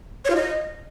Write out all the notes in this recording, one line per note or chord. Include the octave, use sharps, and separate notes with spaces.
C#5
F4
D#5